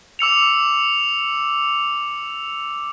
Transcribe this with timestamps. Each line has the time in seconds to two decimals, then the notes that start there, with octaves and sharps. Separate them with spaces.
0.19 D6 E6 C#7 F7